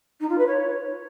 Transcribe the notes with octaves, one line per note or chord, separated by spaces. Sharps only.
D#4
F4
B4
C#5